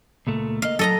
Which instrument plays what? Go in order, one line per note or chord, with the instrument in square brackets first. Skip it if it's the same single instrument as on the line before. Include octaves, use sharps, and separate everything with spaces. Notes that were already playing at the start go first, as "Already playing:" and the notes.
[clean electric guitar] C#2 A#2 A3
[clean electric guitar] A#3 D#5 [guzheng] F5
[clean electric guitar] F#3 [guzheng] A4 D#5 A#5